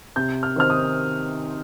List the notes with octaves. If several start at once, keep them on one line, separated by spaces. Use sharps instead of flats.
C3 G6
F6
D#3 C4 D#4 F6
D#6